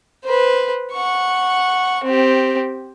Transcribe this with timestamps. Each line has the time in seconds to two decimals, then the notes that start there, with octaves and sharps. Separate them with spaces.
0.25 B4 C5
0.93 F#5 C#6
2.04 C4 G4